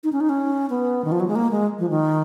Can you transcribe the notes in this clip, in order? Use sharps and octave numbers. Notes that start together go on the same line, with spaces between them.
D#4
C#4
D#4
C#4
B3
D#3
F3
F#3
G#3
A#3
G#3
F3
D#3